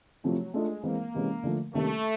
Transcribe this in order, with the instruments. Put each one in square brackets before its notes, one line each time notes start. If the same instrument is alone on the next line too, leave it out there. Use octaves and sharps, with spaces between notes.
[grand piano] C3 F3 A3 C4 E4 [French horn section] F#3
[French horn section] G#3 [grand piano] A3 D4 F4 A4
[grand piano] E3 G#3 C4 [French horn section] A#3
[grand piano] C3 E3 G#3 C#4
D3 F3 A3
[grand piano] C3 D#3 G3 A#3 C#4 [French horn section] A3